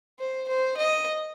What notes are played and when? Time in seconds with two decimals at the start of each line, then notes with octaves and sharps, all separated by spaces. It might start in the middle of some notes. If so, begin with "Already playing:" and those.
0.19 C5
0.48 C5
0.77 D#5